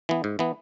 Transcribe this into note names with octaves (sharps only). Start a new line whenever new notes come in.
E3 B3
G#2
E3 B3